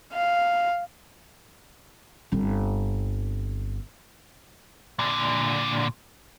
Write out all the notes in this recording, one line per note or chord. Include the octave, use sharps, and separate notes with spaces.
F5
G1 C4
A#2 D3